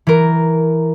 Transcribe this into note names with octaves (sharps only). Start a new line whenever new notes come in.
E3 A#4